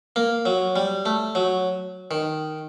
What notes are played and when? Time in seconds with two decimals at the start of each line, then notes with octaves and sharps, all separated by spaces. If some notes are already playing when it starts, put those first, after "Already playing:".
0.16 A#3
0.46 F#3
0.76 G3
1.06 A3
1.35 F#3
2.11 D#3